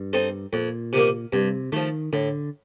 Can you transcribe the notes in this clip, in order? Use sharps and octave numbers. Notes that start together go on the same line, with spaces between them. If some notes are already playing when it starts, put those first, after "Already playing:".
Already playing: G2
C4 D#4 A4 C5
F2 A#2
C3 D#3 A#3
G2 C3
D#3 F3 A3
A2 D3